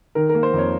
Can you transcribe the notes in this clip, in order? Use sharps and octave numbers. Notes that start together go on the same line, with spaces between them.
D#3 A#4
A#4
A#3
C5
F2 C#5